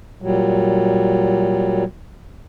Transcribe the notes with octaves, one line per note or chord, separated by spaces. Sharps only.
A#2 F#3 G3